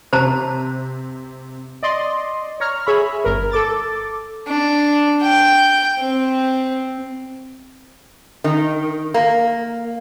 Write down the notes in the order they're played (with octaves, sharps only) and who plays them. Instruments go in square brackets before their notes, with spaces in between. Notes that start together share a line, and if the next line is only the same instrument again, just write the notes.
[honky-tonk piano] C3 [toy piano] C5 A5 A#5
[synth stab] D5 D#5 C6
C#5 A#5 F6
G#4 C#5 E5 B5
G1 A#4
A4 D6 A6
[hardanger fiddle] D4
G5
C4
[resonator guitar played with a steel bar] D#3
A#3